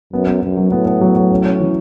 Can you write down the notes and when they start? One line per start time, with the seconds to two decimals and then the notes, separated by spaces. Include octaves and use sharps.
0.13 F#2 B3
0.27 B3
0.43 F#2 B3
0.57 F#3
0.72 A2 B3
0.86 B3
1.01 F#3
1.16 F#3
1.31 C#4
1.46 C#4
1.60 E3